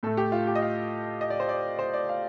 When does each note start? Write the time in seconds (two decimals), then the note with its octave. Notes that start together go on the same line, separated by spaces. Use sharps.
0.03 A2 A3 A4
0.17 G4
0.32 F4
0.47 G4
0.55 D#5
0.62 F5
1.21 D#5
1.30 D5
1.40 C5
1.49 D5
1.79 C5
1.94 D5
2.09 F5